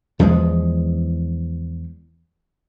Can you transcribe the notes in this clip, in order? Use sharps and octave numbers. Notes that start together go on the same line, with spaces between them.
E2 F3 G3 G#3